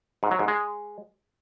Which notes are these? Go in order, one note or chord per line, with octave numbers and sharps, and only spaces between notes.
G#2
F#3
G#2
G#3